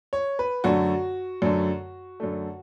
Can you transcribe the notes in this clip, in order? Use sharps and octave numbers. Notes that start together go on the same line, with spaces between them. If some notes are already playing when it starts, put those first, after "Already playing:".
C#5
B4
F#2 D3 A3 F#4
F#2 D3 A3
F#2 D3 A3